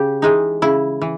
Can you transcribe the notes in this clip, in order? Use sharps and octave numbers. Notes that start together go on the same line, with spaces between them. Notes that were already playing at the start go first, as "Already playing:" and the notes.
Already playing: C#3 G4
E3 G#3 D#4
C#3 E4
E3